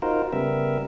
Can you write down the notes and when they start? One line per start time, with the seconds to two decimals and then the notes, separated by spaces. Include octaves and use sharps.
0.02 D#4 F4 F#4 A#4 C5
0.33 C#3 G3 B3 A#4 E5